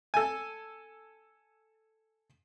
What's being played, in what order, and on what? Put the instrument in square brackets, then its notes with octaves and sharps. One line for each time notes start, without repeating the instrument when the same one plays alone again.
[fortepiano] A4 G#5